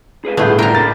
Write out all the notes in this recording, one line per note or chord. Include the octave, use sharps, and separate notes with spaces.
G#4 B4 F5
G1 A2 A3 B3 F4 G#4 G6
D4 E4 F4 A#4 G5 A#5
A#2 B5 A6